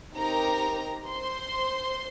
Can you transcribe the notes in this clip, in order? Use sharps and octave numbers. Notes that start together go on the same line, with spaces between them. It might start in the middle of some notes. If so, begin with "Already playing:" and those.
C4 D#4 G4 A#4 A#5
C5 C6